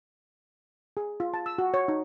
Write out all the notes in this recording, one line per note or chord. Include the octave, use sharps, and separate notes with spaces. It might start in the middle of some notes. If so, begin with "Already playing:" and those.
G#4
F4
A5
E6
F#4
C#5
D#4